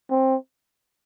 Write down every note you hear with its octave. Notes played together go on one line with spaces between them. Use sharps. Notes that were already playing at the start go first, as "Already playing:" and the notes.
C4